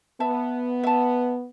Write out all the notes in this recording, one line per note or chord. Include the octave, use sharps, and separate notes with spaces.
B3 E5 A5
E5 A5